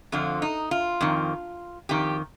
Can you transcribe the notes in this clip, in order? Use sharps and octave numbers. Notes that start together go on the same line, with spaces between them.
F2 D3 F3 F4
D#4
F4
F2 D#3
F2 D#3 G4